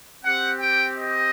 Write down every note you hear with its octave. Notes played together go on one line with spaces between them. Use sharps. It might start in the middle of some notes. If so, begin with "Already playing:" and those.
C4 G4 F#5
G5
D#5